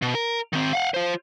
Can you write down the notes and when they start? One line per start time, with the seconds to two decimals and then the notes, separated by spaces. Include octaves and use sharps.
0.02 B2
0.15 A#4
0.53 D#3 C4
0.73 F5 F#5
0.94 F4 C5